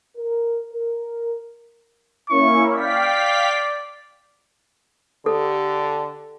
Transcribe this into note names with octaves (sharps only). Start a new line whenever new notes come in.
A#4
A#4
A#3 C#4 E4 C#6
D5 F5 G5 B6
D3 G4 A4